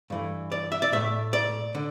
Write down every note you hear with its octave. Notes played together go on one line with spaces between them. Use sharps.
G2 E3 A3
D5
E5
D5
A2 A3 E5
D5
D3